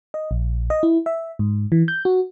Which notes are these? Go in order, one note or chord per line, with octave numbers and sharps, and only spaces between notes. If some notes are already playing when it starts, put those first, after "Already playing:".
D#5
A#1
D#5
E4
E5
G#2
E3
G6
F#4